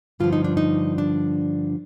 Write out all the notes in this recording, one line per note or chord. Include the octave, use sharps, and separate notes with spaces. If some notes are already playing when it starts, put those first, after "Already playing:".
G2 D3 F3 F4
D#4
D4
D#4
D4